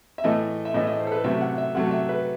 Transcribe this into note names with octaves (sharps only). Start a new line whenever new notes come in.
E5
A2 E3 A3 D#5
E5
A2 E3 A3 D#5
D#5
C5
A4
B4
C3 F#3 A3 E5
F#5
E5
C3 F#3 A3 F#5
E5
B4